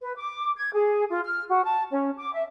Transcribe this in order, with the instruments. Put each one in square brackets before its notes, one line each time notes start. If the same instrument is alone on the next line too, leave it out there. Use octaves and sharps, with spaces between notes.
[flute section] B4
D6
G#6
G#4
F4
F6
F#4
A5
C#4
D6
E5